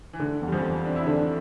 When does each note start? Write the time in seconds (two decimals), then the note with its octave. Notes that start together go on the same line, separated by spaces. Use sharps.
0.13 E3
0.20 D3 A3
0.42 E2
0.47 G3
0.52 F2 F3
0.63 E2
0.85 C4 D4
0.96 E4
1.06 D3 A3 D4